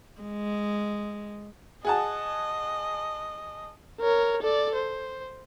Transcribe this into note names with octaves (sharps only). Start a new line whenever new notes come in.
G#3
G#4 D#5 F#5 A5
A#4 C#5
A4 D5
C5